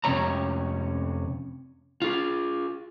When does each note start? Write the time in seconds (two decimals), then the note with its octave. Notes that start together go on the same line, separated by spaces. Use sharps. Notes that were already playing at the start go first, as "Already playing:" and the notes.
0.04 F2 C3 C#4 C#5 A#5
2.02 F4 G#4